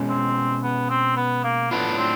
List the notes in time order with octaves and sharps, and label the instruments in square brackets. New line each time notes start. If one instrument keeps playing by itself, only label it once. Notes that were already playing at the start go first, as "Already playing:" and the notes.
Already playing: [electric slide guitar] B2 G#3 C#4
[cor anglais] C4
B3
C4
B3
A#3
[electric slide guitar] A2 F#3 A3 D4 F4 [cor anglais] B3
[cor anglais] C4